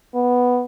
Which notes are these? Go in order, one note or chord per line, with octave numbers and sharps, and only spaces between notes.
B3